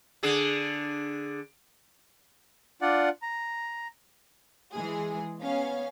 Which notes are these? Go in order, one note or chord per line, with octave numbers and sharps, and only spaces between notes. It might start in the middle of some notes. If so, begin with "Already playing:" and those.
D3 D4 G#4
D4 F4 D5 F#5
A#5
E3 G#3 G#4
B3 C#4 F5